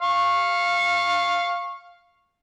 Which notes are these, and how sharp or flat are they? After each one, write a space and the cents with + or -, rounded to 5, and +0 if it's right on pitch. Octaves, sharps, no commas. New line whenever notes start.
F5 +0 C#6 -25